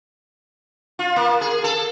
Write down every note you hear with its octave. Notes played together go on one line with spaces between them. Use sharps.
F4
A#3
G#4
A4